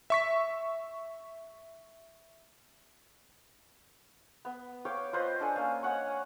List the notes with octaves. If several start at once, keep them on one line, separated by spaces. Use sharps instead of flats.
E5 C#6 B6
B3
C#5 F5 G5 D6
F4 B4 C5 D#5
D4 A4 G#5
A#3 C#4
C#5 D#5 F#5 C#6